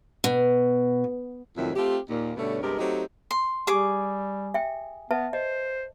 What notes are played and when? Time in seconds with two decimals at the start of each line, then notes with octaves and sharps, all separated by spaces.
0.24 B2
1.57 F2 A2 C3 D#3 F#3 E4
1.75 A3 C4 F4 G4
2.09 D#2 A#2 A#3
2.37 G2 B2 D3 A3 C#4
2.62 G2 C3 G#3 B3 G4 A#4
2.79 F#3 A3 C4 D#4 G4
3.31 C6
3.67 G3 G4 G#4 D6
4.54 E5 G5
5.11 B3 B4 E5 A5
5.33 C5 D#5